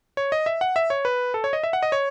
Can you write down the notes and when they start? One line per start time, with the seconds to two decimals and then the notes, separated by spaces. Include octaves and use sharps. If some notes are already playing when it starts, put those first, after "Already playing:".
0.17 C#5
0.32 D#5
0.46 E5
0.61 F#5
0.76 E5
0.90 C#5
1.05 B4
1.34 A4
1.44 C#5
1.53 D#5
1.63 E5
1.73 F#5
1.83 D#5
1.92 C#5